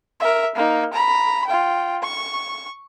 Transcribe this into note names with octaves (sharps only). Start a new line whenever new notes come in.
A#4 E5
A#3 D#4
A#5 B5
F4 G5
C#6